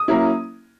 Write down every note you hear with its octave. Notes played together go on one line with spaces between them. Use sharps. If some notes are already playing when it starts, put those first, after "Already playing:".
Already playing: D#6
F#3 A#3 C#4 E4